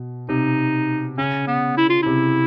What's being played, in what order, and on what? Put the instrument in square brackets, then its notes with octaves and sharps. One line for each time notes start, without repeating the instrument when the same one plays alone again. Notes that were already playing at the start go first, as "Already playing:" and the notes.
Already playing: [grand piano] B2
[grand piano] C3 [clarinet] D#4
[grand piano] C#3 [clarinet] C#4
[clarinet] B3
E4
F4
[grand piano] C3 [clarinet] E4